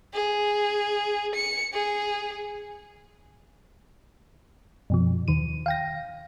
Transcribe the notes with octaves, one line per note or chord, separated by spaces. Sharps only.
G#4
C#7
G#4
F#2 B2 F3
D#2 D#3 D#7
F5 G5 A#6